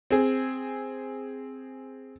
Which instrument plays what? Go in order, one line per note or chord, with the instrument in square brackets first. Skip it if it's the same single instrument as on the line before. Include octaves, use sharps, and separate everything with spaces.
[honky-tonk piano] C4 G#4